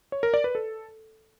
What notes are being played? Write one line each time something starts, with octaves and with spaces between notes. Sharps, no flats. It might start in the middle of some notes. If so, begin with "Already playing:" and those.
C#5
A#4
D5
B4
A4